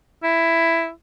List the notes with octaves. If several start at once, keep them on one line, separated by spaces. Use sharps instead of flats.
E4